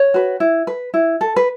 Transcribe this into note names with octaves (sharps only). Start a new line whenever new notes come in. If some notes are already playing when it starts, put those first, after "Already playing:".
Already playing: C#5
F#4 B4
E4
B4
E4
A4
B4